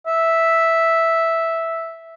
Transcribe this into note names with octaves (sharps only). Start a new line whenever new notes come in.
E5